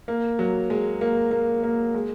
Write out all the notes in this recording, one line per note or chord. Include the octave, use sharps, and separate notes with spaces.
A#3
F#3
G#3
A#3
A#3
A#3
G#3